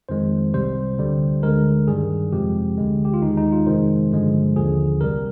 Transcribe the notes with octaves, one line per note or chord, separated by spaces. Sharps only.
F2 D#3 G#3 C5
C2 C3 G3 C5
D2 D3 G3
D2 D3 G#3 A#4
G2 D#3 G3 G#4
F2 C3 F3 G#3 G4
D2 D3 G#3
G4
F4
D#2 D#3 G#3 D#4
D#4
F4
F2 C3 D#3 G#3 C5
G2 D3 F3 G#3
D#2 D3 F3 G#4
C2 C3 G3 A#4